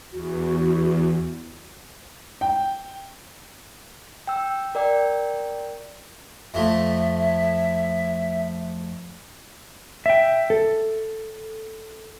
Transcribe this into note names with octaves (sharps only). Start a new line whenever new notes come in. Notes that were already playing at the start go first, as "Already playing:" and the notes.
E2 F#4
G5
G5 E6
A#4 D5 G5
F2 F3 A3 E5
E5 G5
A4